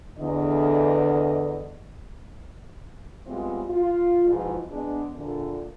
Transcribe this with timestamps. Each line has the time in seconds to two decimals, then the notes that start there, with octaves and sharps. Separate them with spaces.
0.19 E2 D3 D#5
3.26 E3 G3 G#3 B3 C4 F4
3.68 F4
4.26 G#2 B2 E3 F3 G#3
4.71 G#3 B3 D4
5.15 E2 A#2 D3